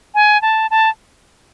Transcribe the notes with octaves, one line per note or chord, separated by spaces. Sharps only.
G#5
A5
A5